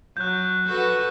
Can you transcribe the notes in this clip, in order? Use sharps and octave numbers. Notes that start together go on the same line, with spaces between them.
F#3 F#6 G6
F#4 A4 B4